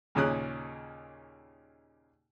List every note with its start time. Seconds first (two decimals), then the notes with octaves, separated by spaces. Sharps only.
0.15 D#2 A#2 C#3 C#4 D#6 F#6